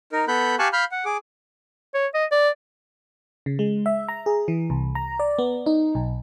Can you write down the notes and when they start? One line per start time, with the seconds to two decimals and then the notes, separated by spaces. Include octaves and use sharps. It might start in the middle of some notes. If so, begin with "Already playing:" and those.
0.12 D#4 A#4
0.28 B3 A4 B5 F#6 G6
0.59 G4 F5 G#5 A5 C#6 F#6
0.73 F5 B5 F6 G6
0.91 F#5
1.05 G#4 D6
1.94 C#5
2.14 D#5
2.32 D5
3.46 C#3
3.59 G#3
3.86 E5
4.08 A#5
4.26 G#4
4.48 E3
4.70 C2
4.95 A#5
5.19 D5
5.39 B3
5.66 D#4
5.95 B1